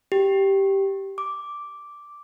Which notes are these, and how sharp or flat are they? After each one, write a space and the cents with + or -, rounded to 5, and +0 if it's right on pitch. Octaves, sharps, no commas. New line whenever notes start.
G4 -5
D6 -5